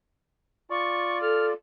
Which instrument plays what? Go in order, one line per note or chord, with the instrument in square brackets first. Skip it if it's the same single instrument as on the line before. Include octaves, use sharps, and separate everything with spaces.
[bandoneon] F4 D5 [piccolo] C#6
[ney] A4 [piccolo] F6